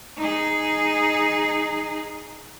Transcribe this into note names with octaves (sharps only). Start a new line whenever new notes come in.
D#4 G#4